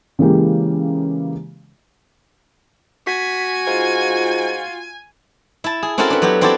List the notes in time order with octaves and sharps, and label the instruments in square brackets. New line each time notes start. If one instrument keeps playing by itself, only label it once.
[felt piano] C#3 E3 G#3 A#3 G4
[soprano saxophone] F#4 [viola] G#5 [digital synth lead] B6
[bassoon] G#2 [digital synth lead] F4
[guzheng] E4 A5
G#4
C4 C#4 E4 F#4 A4 A#4
D4 B4
F#3 B3 F#4 G4
C4 E4 F#4 G4 A4 D5